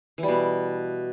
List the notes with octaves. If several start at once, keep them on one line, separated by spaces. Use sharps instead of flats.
E3
G3
B2